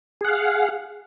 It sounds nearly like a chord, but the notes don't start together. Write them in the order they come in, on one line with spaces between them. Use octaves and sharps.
G#4 F#5 F5